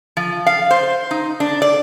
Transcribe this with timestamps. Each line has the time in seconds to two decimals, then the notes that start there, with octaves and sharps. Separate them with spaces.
0.17 F3
0.46 F5
0.71 C5
1.11 D#4
1.40 D4
1.62 D5